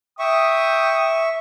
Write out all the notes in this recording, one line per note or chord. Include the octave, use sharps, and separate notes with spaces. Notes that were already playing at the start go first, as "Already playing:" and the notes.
E5 G5 C#6 D#6